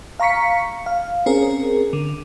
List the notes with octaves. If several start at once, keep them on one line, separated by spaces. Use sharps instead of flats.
F5 A#5 C#6 B6 C#7
F5
C4 C#4 G#4 A#4
D3